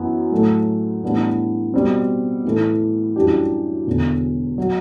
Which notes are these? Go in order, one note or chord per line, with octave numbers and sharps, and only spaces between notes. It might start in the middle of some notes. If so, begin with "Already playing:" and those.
Already playing: F#2 E3 B3
A2 F#3 A3
A2 E3 G3 B3 D4
B2 G3 C4
A2 E3 A3
F#2 E3 G3 D4 G4
E1 E2 D3
F#3